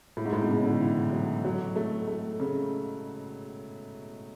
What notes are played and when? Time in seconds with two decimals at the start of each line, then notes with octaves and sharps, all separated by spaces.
0.17 A2
0.25 G#2
0.33 A2
0.42 B2
0.49 C#3
0.65 D3
0.81 E3
1.12 F#3
1.45 F#3
1.76 A3
2.07 A3
2.40 C#3